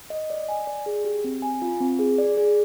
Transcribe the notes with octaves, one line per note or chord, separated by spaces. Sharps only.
D#5
D5
G#5
D5
G#4
G4
C4
G#5
F4
C4
G#4
D5
G#4